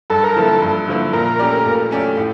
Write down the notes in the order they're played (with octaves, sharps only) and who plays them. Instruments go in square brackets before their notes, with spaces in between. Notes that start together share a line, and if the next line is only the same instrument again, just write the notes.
[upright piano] G2 [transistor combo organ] A4
[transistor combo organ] A#4
[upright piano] D3 F3 A#3 E4 [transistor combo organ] A4
[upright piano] G2
D3 F3 A#3 E4
[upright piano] A#2 [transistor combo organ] A#4
[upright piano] A3 C#4 G4 D5
A#2
A3 C#4 G4 D5
A2